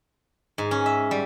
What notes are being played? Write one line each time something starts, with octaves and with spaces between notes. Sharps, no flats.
G#2
C#4
E5
G3